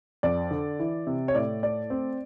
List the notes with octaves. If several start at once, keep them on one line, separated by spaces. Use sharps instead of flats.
F2 D5
D3
E3
C3
C#5
A2 D5
A3 D5
C4